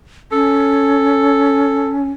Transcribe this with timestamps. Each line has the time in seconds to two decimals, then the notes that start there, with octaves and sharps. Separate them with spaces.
0.32 C#4 A4